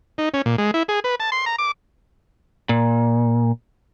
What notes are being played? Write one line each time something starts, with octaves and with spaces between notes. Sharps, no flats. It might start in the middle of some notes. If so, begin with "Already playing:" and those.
D#4
C#4
A#2
G#3
E4
G#4
B4
A5
C6
A#5
D6
A#2